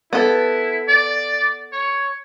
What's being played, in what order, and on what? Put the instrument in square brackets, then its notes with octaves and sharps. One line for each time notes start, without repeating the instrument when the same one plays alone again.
[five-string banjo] B3 A4 [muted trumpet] E4
[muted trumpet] D5
C#5